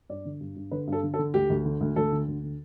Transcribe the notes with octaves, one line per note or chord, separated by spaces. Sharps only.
G2 D5
D3
G2
G2
D3 B4
G2
A4
D3
A4
D3
D2 G4
D2
D3
D2
D2 A4
D3
D2
D3